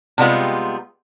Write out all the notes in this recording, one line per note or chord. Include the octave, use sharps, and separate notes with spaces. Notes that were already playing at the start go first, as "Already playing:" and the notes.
C3 G3 G#3 B3 F4